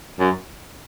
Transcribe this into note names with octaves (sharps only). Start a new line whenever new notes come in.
F#2